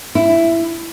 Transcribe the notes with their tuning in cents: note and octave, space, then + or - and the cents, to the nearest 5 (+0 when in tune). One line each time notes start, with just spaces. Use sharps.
E4 +10